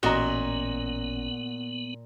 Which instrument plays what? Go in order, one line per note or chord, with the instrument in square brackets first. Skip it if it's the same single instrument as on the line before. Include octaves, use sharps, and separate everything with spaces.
[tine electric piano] A1 C#4 [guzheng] A#2 [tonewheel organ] B3 [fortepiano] F#4 D#5 A#5